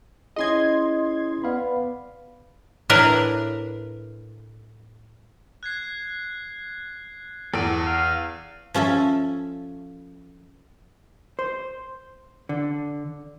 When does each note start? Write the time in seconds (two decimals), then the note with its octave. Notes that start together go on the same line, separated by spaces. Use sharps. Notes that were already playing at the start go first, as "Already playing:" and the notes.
0.36 C#4 E4 G#4 D#5 C6 G#6
1.44 B3 D5 F5 B5
2.89 A2 D4 E4 A#4 B4
5.63 F#6 G#6 C7
7.54 E2 A4 D5 E6 D7 D#7
7.87 F5
8.74 F3 C#4 A4 E5
11.39 C5
12.49 D3